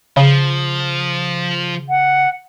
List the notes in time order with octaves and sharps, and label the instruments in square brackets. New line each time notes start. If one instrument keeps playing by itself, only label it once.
[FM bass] C#3 [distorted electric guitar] F3
[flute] F#5